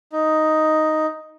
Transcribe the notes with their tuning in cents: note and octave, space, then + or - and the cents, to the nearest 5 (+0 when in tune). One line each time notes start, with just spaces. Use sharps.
D#4 +5